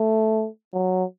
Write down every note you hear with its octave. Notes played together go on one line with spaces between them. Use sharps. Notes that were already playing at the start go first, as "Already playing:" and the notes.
Already playing: A3
F#3